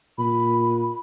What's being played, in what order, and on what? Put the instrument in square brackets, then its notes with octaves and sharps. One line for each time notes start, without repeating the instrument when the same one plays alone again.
[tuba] A#2 [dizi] B5